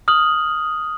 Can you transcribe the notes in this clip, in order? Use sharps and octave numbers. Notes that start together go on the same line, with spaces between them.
D#6 F6 F#7